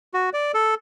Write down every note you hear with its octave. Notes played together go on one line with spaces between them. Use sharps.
F#4
D5
A4